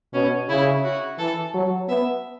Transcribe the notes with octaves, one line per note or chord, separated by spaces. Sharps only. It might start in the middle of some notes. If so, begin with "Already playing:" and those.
B2 C#4
C#3 E4
F#4
E3 A4
F#3
B3 E5